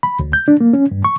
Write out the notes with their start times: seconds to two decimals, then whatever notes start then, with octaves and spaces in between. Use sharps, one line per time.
0.03 B5
0.19 D2
0.33 G6
0.48 D4
0.61 A#3
0.73 C#4
0.92 G2
1.05 C#6